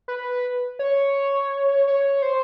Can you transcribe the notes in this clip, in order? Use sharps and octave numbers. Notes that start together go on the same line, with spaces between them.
B4
C#5
C#5
C5